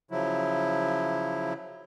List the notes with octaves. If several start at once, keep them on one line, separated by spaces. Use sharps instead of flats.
C#3 F3 F#3 E4